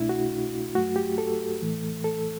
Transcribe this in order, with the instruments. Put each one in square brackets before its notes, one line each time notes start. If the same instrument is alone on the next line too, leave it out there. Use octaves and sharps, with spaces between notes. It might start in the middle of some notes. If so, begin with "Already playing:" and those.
Already playing: [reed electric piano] C2 B2 A3 D4 E4
F#4
G2 F#3 A3 F#4
G4
A4
A2 E3 A3
A4